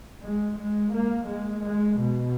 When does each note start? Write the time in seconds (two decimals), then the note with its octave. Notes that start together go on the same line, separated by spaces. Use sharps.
0.23 G#3
0.58 G#3
0.93 A#3
1.28 G#3
1.65 G#3
2.00 B2